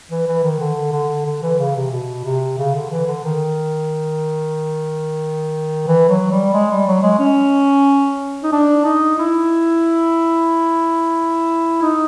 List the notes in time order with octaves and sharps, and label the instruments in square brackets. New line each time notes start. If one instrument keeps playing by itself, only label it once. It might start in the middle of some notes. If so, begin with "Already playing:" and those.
[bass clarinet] E3
E3
D#3
D3
D3
D3
E3
C#3
C3
B2
C3
C#3
D3
E3
D3
D#3
E3
F#3
G3
G#3
G3
F#3
G#3
C#4
D#4
D4
D#4
E4
D#4